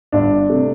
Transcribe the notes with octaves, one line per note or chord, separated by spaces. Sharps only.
G1 G2 G3 D4
C3 A3